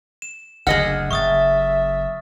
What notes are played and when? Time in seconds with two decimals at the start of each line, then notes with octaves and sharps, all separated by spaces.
0.22 E7
0.67 F#1 D2 D3 G#4 D#5 F#5 F6
1.11 F#1 E5 C#6 D#6 A6